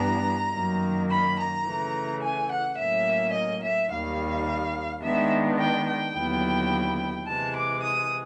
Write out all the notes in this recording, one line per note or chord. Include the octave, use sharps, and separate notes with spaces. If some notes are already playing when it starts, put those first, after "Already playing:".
Already playing: G2 E3 G3 B3 D4 A#5
F#2 D#3 F#3 A#3
B5
A#5
C#3 E3 A3
G#5
F#5
A2 F#3 A#3 C#4 E5
D#5
E5
D#2 D#3 G3 F5
D#3 G#3 B3 D4 E5
G5
G5
D#2 D3 F#3 B3 E4
C3 E3 G#3 A5
D6
D#6